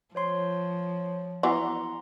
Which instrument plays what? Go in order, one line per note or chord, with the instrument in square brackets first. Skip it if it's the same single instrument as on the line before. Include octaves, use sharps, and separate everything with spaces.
[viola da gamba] F3 [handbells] C5 C#5 C6
[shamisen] E3 F#3 B3 [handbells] F#5 A#5 C6